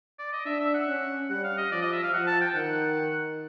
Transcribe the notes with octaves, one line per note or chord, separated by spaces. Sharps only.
D5
D#5
D4 E5
E5
F#5
C#4
G3 F#5
F5
D#5
F3 D5
D#5
E5
F5
F3 F#5
A5
G5
D#3 F#5